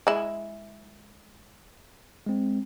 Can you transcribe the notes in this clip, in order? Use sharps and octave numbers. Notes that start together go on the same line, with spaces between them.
G#3 E4
G#3 C4